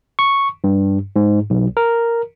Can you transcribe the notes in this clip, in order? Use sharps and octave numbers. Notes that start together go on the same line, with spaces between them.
C#6
G2
G#2
B1
A#4